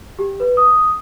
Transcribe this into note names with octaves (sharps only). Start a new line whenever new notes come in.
G4
B4
D#6